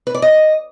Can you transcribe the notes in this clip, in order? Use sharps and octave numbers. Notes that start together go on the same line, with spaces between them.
B4
D5
D#5